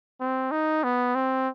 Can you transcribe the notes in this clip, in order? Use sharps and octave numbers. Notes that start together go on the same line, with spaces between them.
C4
D#4
B3
C4